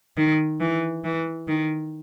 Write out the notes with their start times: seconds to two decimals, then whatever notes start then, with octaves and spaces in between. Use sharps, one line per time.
0.17 D#3
0.60 E3
1.04 E3
1.48 D#3